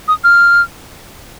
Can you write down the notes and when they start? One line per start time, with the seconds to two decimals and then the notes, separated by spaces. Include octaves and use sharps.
0.08 D#6
0.24 F6